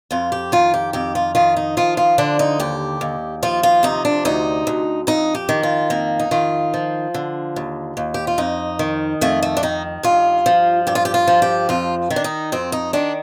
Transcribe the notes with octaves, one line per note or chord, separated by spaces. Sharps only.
F2 F4
G4
D#3 F4
G4
F2 G4
F4
D#3 F4
D#4
F3 F4
F4
D3 D4
D#4
D#2 G4
D#2
F3 F4
F4
C3 D#4
D4
D2 D#4
D2
F2 D#4
G4
D#3
F4
F2 A#3
D#4
D#3 F4
F3
D3
D#2
D#2
G4
F4
F2 D#4
D#3
F2 A3
A3
D4
D#3 D#4
G2 F4
F3
G2 G4
F4
G4
F4
F3
G4
F2 F4
D#3
D4
D#4
F2 C4
D#4
D#3 D4